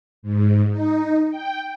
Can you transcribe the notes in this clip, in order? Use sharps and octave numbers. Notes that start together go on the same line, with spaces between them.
G#2
D#4
G5